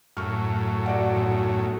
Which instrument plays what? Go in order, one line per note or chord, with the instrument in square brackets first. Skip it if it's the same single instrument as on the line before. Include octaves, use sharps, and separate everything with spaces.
[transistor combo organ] F#2 A2 [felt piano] C#6 F6
[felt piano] F#4 D5 F#5
B1